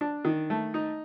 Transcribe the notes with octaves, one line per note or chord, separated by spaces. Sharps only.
D4
D#3
A3
D#4